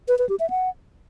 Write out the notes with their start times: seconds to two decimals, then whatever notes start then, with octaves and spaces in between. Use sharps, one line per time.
0.08 B4
0.19 B4
0.29 G4
0.40 E5
0.50 F#5